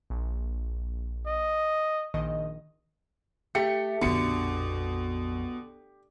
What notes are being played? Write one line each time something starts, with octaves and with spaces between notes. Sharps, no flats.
A#1
D#5
A#1 D#3 D#5
A3 G4 C#7
A#1 F2 B2 D3 C#7